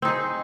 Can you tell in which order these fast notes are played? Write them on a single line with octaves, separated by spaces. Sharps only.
C4 D#4 G#4